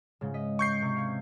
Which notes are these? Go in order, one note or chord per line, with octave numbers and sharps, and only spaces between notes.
G#2 C#3
D#5 B6 D#7
C#6 G6 C7
C3 C#7
F5 G#6